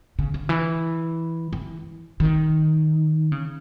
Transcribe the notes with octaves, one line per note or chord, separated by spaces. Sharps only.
C#3
D3
E3
E3
D#3
C#3